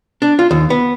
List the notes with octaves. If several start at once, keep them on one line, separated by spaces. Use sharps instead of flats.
D4
F4
D#2
B3